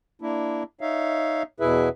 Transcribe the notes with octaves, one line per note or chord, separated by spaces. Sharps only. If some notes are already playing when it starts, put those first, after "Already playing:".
A#3 D4 E4
D#4 C#5 E5 F5
E2 B2 E4 G#4 B4 E5